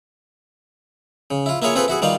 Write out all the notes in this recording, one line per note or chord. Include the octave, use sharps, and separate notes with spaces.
C#3
E4 F4
A#3 E4 F4 G#4 C#5
C4 F4 G#4 A4 B4
E4 F#4 G#4
D#3 G3 F4 D5 F5